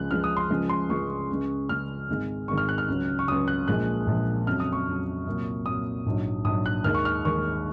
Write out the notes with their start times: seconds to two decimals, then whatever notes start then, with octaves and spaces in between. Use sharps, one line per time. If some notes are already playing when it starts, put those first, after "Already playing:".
Already playing: C#2 C#3 F3 G#3 F#6
0.11 C#2 C#3 F3 G#3 F6
0.24 D#6
0.37 C6
0.50 C#2 C#3 F3 G#3
0.69 C6
0.89 C#2 C#3 F3 G#3 C#6
1.30 C#2 C#3 G#3
1.69 C#2 C#3 G#3 F6
2.08 G#1 G#2 D#3 G#3
2.48 G#1 G#2 D#3 G#3 C#6
2.58 F6
2.69 F#6
2.78 F6
2.88 C#2 C#3 F#3
3.19 C#6
3.27 C#2 C#3 F#3 D#6
3.48 F#6
3.68 A#1 A#2 F3 G#3 F#6
4.07 A#1 A#2 F3 G#3
4.47 F2 C#3 F#3 F6
4.60 D#6
4.73 C#6
4.86 F2 C#3 F#3
5.27 C2 A#2 F#3
5.65 C2 A#2 F#3 D#6
6.06 A#1 G#2 F#3
6.45 A#1 G#2 F#3 D#6
6.66 F#6
6.84 D#2 D#3 G#3 F6
6.94 C#6
7.05 F6
7.25 D#2 D#3 G#3 C#6